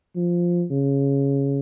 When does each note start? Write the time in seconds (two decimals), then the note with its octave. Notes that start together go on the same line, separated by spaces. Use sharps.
0.16 F3
0.71 C#3